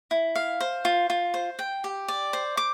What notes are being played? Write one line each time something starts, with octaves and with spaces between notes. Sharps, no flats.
E4
F5
C5
F4
F4
C5
G5
G4
D5
C5
D6